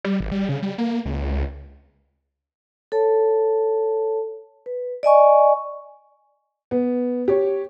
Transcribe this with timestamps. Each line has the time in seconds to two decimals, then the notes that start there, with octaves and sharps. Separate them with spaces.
0.04 G3
0.20 G#1
0.31 G3
0.49 C#3
0.62 G3
0.78 A#3
1.05 C#2
2.92 A4 C#5 A5
4.66 B4
5.03 D5 D#5 G#5 C#6
6.71 B3
7.28 G4 C#5